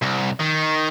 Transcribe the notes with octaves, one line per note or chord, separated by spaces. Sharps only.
C2
D#3